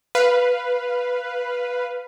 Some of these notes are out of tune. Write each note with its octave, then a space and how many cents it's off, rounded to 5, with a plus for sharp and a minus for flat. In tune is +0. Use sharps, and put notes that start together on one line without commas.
B4 +0 F5 +0